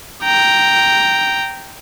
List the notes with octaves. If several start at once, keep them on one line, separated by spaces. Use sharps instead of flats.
G5 A#5